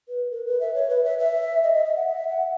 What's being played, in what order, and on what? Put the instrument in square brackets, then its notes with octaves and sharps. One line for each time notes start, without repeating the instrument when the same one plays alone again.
[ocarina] B4
A#4
B4
E5
C#5
B4
E5
E5
D#5
D#5
E5
F#5
E5
F#5